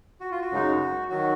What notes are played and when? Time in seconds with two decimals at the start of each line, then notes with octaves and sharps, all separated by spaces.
0.20 F#4
0.31 F4
0.41 F#4
0.51 F#2 C#3 G#3 D#4
1.10 D#3 F#3 F#4